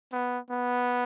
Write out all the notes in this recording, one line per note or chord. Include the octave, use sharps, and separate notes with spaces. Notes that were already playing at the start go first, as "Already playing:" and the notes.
B3
B3